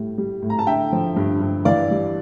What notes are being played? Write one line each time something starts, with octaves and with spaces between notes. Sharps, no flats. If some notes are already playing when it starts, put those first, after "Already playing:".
Already playing: A2 G3
G3
A2
A#5
A5
D3 E5 G5
F3
G2
G2
E3 D5 F5
G3